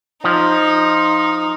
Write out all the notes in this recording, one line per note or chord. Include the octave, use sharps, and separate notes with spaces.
F3 D#4